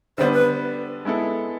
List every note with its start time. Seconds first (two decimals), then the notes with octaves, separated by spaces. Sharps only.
0.18 D3 G3 B3 D4 C5
0.33 B4
1.05 G#3 B3 E4 A4